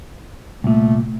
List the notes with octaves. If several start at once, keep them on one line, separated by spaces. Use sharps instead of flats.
C2 A#2 A3